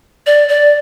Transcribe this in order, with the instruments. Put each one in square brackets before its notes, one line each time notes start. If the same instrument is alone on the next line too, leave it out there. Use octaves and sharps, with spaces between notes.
[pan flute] D5
D5